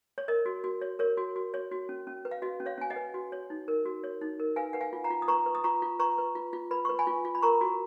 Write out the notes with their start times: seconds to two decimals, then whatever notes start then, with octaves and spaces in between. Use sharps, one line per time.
0.18 C#5
0.28 A#4 D#5
0.46 F#4
0.64 F#4
0.81 C#5
0.99 A#4 C#5
1.17 F#4
1.36 F#4
1.54 C#5
1.71 F#4
1.89 C#4
2.07 C#4
2.25 B4
2.31 F5
2.42 F#4 D#5
2.60 C#4
2.66 C#5 F5
2.78 C#4 G#5
2.90 D#5 F#5
2.96 B4
3.14 F#4
3.32 C#5
3.50 D#4
3.68 A#4
3.85 F#4
4.04 C#5
4.21 D#4
4.40 A#4
4.56 B4 F5 G#5
4.73 B4 F#5
4.81 F5 G#5
4.93 F4
5.04 F#5 A#5
5.10 F4
5.22 D#6
5.28 B4 A#5 C#6
5.46 B4
5.55 D#6
5.64 F4 A#5 C#6
5.82 F4
5.99 B4 A#5 C#6
6.18 B4
6.35 F4
6.53 F4
6.71 B4 B5
6.85 B4 C#6
6.99 G#5 B5
7.07 F4
7.25 F4
7.35 B5
7.42 A#4 A#5 C#6
7.61 F#4